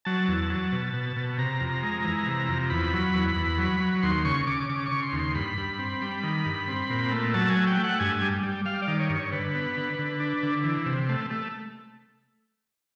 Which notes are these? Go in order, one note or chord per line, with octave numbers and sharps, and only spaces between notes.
F#3 A5
E2
F#3
B2
B2
B2
C3 A#5
F2
G#3
E3
C3
F2
E2 B5
F#3
E2
E2
F#3
F#3
D#2 C6
C#3 C#6
C#3 D6
C#3 D6
D6
C#6
C#3
C6
D#2
C6
G2 B5
G2
C4
G3
D#3
G2
C4
A#2
A3
F#3 A5
G#5
A3
G5
A3
F#5
G2 G#5
G3
G3
G3 F5
D5
D#3
C#5
G2
C#5
D3 B4
B3
D3
D3
D4
D3
E3
C3
A3
A3